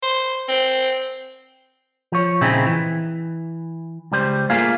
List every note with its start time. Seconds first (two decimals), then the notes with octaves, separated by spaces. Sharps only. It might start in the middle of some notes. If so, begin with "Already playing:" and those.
0.03 C5
0.48 C4
2.12 F3 C#5
2.41 A#2 C#3 C4 D#4 E4 G#4
2.66 E3
4.12 C#2 G3 C5
4.50 A3 A#3 F4 G#4 F5